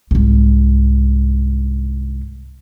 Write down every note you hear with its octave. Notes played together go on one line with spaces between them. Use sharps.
C2 G#2